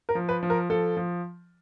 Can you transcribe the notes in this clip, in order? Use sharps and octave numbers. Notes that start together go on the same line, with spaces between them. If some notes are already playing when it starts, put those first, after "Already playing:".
A#4
F3
B4
F3
A#4
F3 A4
F3